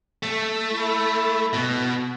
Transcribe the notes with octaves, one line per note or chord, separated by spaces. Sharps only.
A3
E4
B2